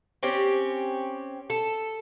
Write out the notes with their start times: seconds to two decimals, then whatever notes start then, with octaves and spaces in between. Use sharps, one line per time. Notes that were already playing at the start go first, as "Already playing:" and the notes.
0.23 C4 C#4 G4
1.50 A4